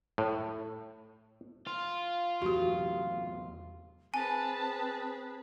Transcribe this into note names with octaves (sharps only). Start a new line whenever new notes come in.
A2
F4
E2 F#3 A3 F#4 G4
C4 G#4 B4 G#5 A5